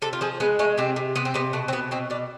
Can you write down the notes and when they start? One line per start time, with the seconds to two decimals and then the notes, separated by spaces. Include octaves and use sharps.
0.02 C3 A4
0.13 F4
0.21 F3 G#4
0.40 G#3 B3
0.59 G#3 A3
0.78 C3 C4
0.96 C3
1.16 C3 B3
1.25 C4
1.34 C3 B3
1.53 B2 A3
1.68 C4
1.73 B2 B3
1.91 B2 C4
2.10 B2 D4